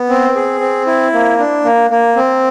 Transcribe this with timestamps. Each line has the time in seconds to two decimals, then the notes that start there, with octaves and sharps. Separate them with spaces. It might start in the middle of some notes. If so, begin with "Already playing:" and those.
Already playing: B3
0.09 C4
0.35 G#4
0.61 C4
0.87 E4
1.13 A#3
1.38 D4
1.64 A#3
1.90 A#3
2.16 C4